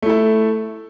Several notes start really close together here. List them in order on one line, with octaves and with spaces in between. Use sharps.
A3 E4 A4